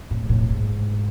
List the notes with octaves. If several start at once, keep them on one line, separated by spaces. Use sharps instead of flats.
A2
A2
G#2